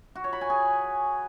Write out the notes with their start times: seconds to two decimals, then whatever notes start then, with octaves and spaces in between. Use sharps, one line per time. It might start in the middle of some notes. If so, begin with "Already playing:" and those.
0.15 F#4
0.24 C#5
0.33 B5
0.41 G#5
0.50 G#4